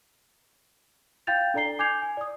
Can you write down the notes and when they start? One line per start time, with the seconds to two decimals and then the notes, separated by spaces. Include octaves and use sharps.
1.27 F5 G5 G6 A6 F7
1.54 D4 A4 D5 A#5 C7 G7
1.79 G#5 D6 G6 G#6 C7 F7
2.02 G#5
2.17 D5 D#6